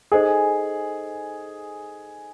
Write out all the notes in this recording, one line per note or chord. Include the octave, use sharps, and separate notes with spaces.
D#4 G#4 A4 C5 D#5 G#5